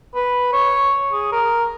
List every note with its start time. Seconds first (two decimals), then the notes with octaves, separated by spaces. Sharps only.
0.15 B4
0.53 C#5
1.12 G#4
1.32 A#4